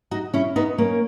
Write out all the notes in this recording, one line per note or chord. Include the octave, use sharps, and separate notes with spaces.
D#4 F#4
C#4 E4
B3 D#4
A#3 C#4